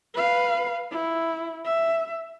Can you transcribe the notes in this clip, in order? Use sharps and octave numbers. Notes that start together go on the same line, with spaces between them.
B4 F5
E4
E5